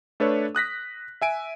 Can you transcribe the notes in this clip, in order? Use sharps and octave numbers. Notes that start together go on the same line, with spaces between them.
A3 D4 A4 B4 C#5
D#6 F#6 A#6 B6
E5 G#5 D7